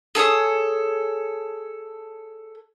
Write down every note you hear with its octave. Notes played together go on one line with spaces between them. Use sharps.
G#4 A4 C#5 D#6